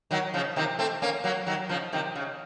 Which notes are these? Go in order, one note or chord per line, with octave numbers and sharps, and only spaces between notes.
D#3 F#3
C#3 F3
C3 D#3
A3 C4
A#3 C#4
F#3 A#3
D#3 F#3
C#3 F3
C3 D#3
C#3